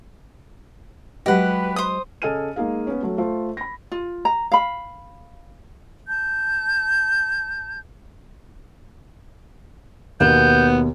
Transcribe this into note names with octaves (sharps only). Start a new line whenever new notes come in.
F#3 G#3 G4 B4 D#5 F#5
C5 D#6
C#3 A4 D#5 G#5 F6 D#7
G#3 A#3 D#4 G#4 F5
B3 C#4
F#3 A3
A3 F4 C5
B5 A#6
F4
A#5
F5 B5
A5 G6
D#2 B2 B3 G6